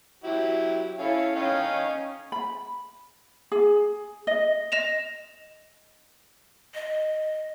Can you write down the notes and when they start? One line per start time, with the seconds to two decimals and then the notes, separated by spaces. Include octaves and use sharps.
0.24 F#3 E4 G4
0.99 C#4 E4 A4 C#5 F5
1.36 C#4 D#4 C#5 D#5 F5 G5
2.32 B5
3.52 G#4
4.27 D#5
4.72 D#5 A#6 E7 F7
6.74 D#5